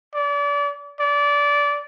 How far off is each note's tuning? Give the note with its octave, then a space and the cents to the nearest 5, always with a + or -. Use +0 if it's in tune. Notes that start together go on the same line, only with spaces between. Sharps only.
D5 -35
D5 -20